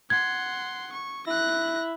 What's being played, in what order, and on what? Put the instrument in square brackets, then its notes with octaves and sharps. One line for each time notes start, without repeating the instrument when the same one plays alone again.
[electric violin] F#5 C6 [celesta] G#6
[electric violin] C#6
[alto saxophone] E4 [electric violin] F#6 A#6